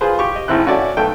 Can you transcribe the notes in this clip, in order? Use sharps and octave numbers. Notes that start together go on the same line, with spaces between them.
F4 G#4 B4 C5
G4 C#6
D#5
G#1 A2 C4 E4 F#6
C#4 F#4 A4 D5 E5
B1 A3 A4 G5